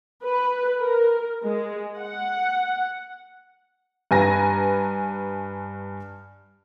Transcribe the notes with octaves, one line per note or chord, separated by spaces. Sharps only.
B4
A#4
G#3
F#5
G2 B4 G#5 A#5 A#6